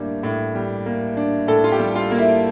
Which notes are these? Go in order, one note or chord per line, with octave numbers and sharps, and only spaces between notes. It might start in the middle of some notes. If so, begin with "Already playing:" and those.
Already playing: A2 G3 A#3 D4
A2
G3
A#3
D4
A2 A4
F4
G4
G3
F4
A#3
E4